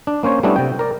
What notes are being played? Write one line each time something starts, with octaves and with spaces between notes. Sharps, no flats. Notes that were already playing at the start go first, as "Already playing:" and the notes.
D4
A#3 C#4 C5 C#5
G3 A3 B3 C#4 D4 E4
C3 G5
A#4 D5